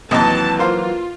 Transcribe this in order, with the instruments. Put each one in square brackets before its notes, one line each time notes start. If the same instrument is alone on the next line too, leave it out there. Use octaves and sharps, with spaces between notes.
[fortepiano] D#2 C3 D#5 [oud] E3 F#3 [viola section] A5
[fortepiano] A#3 C5 F5 [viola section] F4